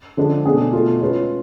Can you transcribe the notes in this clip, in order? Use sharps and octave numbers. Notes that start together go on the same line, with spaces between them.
D3 F3 G#3 D4
B2 A3 D4 G#4
B2 A3 F4
G#3 C#4 F4 B4